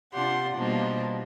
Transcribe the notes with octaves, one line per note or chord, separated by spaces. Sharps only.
C3 D4 F4 G4 F#5 C6
B2 F3 G3 A#3 D4 D#4